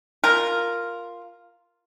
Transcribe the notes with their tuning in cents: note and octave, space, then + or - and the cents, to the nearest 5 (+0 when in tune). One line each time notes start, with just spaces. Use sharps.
F4 +0 A#4 +0